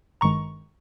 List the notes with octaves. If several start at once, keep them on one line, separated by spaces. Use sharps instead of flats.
G#1 G2 D#3 G#3 A#5 C#6